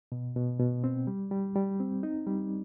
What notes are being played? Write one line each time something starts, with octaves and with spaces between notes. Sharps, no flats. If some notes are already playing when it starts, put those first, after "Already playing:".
B2
B2
B2
C4
G3
G3
G3
C4
D#4
G3